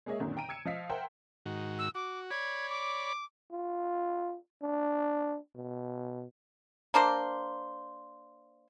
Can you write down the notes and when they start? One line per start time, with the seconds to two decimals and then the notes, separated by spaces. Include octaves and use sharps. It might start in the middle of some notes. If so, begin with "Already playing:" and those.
0.06 G#3 A#3 G#4 C#5 D#5 E5
0.19 F#2 A#2 D3 D#3 C4
0.37 G5 A#5 D7 D#7
0.49 E6 G#6 C#7 E7
0.65 F3 D#5 F5 B6
0.89 A#4 C5 E5 F#5 G5
1.46 G#2 D#3 F#4
1.79 E6
1.95 F#4 D6
2.31 C#5 D5 B5 G#6
2.70 D6
3.51 F4
4.62 D4
5.55 B2
6.94 A#3 D4 A#4 C5